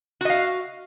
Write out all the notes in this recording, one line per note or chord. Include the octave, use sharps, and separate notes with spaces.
F#4 D#5 F5